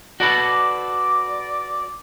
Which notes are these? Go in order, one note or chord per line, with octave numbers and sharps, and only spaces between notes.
F#4 A4 B4 D5